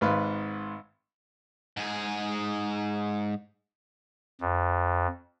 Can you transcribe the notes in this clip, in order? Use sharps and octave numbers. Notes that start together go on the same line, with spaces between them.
G#1 G#2 B4 F5 B5
G#2 G#4
F2